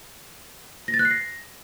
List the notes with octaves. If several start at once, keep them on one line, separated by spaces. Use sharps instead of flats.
A#6
A6
F#6
C7
A#6